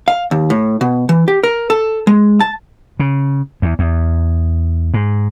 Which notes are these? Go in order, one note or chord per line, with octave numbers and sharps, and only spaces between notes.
F5
D#2
A2
B2
E3
G4
A#4
A4
G#3
A5
C#3
E2
E2
G#2